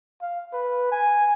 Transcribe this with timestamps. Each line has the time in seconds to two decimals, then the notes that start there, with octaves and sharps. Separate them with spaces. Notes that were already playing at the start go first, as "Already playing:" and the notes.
0.21 F5
0.53 B4
0.91 G#5